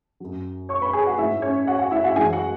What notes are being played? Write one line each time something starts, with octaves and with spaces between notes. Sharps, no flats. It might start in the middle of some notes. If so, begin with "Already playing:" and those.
F#2 F#3
C#5 C#6
B4 B5
G#4 G#5
F#4 F#5
G#2 G#3 E4 E5
C#4 C#5
F#4 F#5
F#4 F#5
E4 E5
F#4 F#5
F#2 E3 G#3 G#4 G#5
F#4 F#5